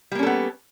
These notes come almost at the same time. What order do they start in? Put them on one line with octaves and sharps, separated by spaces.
G3 A#3 C#4 A4 B3